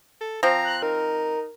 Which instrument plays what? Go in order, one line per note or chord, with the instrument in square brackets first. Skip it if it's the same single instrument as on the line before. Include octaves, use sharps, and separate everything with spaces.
[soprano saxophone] A4
[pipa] F3 C4 [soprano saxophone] A#5
[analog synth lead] F#6
[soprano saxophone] D#4 [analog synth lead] A#4